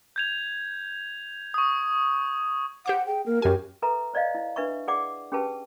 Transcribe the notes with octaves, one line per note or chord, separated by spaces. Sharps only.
G6 G#6 F7
C#6 D#6
G4 C5 F#5 D6
G#4 G5
A#3 A#4
F#2 G4 A#4 G#5
A4 B4 E5 A#5
C5 D5 D#5 F5
E4
D4 B4 E5 C#6
G#4 D5 F#5 D6
C#4 G4 G#4 B4 A5